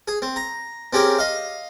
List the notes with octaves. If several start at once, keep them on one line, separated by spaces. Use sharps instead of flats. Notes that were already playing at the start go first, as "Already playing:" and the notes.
G#4
C4
A#5
C4 C#4 G4 G#4 A#4
D#5 F5